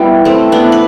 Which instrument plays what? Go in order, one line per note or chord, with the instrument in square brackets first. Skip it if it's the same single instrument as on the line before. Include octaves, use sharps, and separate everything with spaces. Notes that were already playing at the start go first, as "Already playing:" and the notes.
Already playing: [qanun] G3 B3 [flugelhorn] E4
[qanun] A3 C4
B3 D4
B4